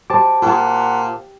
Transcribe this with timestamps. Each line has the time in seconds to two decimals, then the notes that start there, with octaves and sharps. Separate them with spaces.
0.10 G4 C5 A5 D6
0.42 A#2 G4 F#5